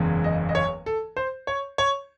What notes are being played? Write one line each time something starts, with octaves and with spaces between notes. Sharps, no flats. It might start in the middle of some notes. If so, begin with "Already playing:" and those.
Already playing: F#1 E2 C#3 E3 G#3
D#5
D#5
C#5
A4
C5
C#5
C#5